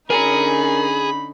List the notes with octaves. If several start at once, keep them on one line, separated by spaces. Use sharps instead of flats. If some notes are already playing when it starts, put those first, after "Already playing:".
D3 C#4 D#4 G#4 A#4 G#5 A#5 B5